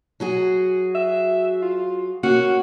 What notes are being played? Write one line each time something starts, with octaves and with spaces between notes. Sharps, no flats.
F#3 F#4 G#4
E5
F4
A#3 C#4 F#4 F#5